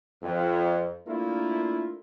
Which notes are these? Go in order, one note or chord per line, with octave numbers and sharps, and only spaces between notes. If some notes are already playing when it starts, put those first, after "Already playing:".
F2
A3 A#3 D4 E4 F4 A#4